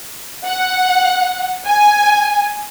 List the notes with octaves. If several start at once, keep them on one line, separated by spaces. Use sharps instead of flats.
F#5
G#5